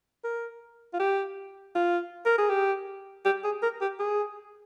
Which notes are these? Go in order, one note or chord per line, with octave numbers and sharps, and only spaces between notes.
A#4
F4
G4
F4
A#4
G#4
G4
G4
G#4
A#4
G4
G#4